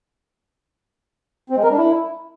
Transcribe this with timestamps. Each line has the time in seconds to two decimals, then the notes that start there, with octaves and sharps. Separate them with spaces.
1.50 C4
1.57 G#3
1.64 A#4
1.71 D4
1.78 E4